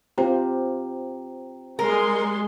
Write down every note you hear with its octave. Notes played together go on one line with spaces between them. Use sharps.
C4 F4 G4 C5 G5 A#5
G3 G#3 A#4 C6